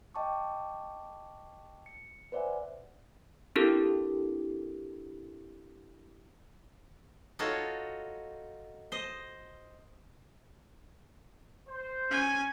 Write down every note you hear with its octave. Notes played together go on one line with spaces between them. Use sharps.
D#5 G5 A5 C#6 D6
C#7
B4 C5 D5 E5 F#5 G#5
C4 D4 E4 G4 A4 A#4
D#4 F4 F#4 A4 C#5
C5 D#5
C5
C#4 G#5